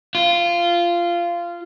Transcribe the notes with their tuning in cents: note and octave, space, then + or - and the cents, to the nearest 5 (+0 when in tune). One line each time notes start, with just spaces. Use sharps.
F4 -15